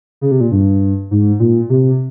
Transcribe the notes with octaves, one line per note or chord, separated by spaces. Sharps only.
C#3
C3
A#2
G2
G#2
A#2
C3